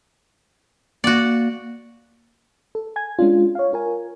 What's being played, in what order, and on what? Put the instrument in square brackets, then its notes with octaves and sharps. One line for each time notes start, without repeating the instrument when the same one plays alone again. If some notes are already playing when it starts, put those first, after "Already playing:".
[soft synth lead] A#3 [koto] F#4 D5
[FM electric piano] A4
G#5 G#6
G#3 C#4 D4 F4
C#5 F5
F4 A#4 G#5